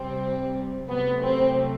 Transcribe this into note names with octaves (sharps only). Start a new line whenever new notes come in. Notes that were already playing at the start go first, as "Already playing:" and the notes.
Already playing: C3 G3 C4
C3 F#3 A3 B3
C4